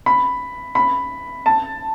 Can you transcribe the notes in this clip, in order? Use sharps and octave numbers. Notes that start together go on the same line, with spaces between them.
B5
B5
A5